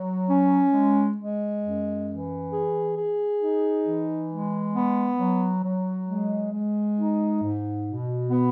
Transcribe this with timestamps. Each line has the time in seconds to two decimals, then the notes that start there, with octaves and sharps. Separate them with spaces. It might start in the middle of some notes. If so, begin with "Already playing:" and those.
Already playing: F#3
0.29 C#4
0.73 G#3
1.18 G#3
1.62 F#2
2.08 E3
2.52 G#4
2.97 G#4
3.41 D#4
3.85 E3
4.30 G#3
4.75 B3
5.19 F#3
5.63 F#3
6.07 G#3
6.53 G#3
6.97 D#4
7.42 G#2
7.86 B2
8.30 B3